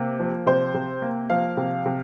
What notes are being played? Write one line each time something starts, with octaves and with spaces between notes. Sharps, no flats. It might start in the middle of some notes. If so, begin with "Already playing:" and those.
Already playing: C3 A#3
F3
C3 C5
C3
A#3
F3 F5
C3
C3